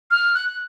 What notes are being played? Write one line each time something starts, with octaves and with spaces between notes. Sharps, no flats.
F6
F#6